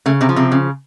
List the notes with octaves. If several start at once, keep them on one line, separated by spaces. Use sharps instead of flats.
C#3 A3
C3 C4
F3
C3 C4
C#3